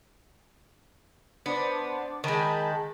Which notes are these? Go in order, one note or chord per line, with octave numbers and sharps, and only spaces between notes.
B3 D4 C5 D5
D#3 G#3 A5 B5 G6